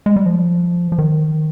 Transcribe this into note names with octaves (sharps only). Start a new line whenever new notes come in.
G#3
G3
F3
F3
D#3